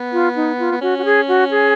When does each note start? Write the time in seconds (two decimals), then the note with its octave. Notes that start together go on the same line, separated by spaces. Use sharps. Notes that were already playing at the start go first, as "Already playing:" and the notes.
Already playing: B3
0.13 F4
0.36 D#4
0.59 F4
0.72 B3
0.81 C#4 F#4
0.98 F#4
1.05 G#4
1.28 F#4
1.51 G#4